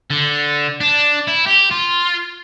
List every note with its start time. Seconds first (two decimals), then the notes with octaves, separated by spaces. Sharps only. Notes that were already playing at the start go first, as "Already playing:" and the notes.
0.11 D3
0.81 D4
1.27 E4
1.46 G4
1.71 F4